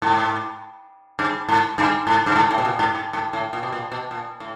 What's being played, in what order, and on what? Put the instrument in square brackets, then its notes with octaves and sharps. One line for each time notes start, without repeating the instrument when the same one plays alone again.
[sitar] G#2
G2
G#2
G2
G#2
G2
G#2
A2
B2
A#2
G#2
G#2
G#2
A2
A#2
B2
A#2
B2
A#2
A2